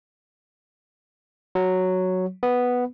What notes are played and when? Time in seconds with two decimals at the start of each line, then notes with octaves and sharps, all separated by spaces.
1.55 F#3
2.43 B3